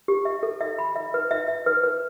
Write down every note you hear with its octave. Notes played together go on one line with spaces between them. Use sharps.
G4
E5
A4
E5
B5
E5
B4
E5
E5
B4
B4